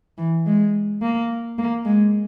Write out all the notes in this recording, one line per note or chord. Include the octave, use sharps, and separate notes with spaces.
E3
G#3
A#3
A#3
G#3